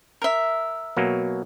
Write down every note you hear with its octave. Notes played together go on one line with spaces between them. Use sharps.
A#4 E5
B2 F#3 A#3